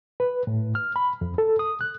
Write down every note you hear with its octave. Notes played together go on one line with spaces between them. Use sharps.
B4
A2
F6
B5
F2
A4
D#6
F#6